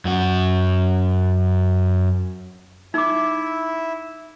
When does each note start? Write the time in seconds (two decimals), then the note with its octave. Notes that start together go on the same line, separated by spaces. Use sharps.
0.05 F#2 F#4
2.94 D#4 E4 E5 D6